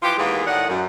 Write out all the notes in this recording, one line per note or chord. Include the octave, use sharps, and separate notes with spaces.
E3 F3 F4 G4
D#2 E3 G#3 A#3 B3 G#4
A2 D#3 D5 F#5
F#2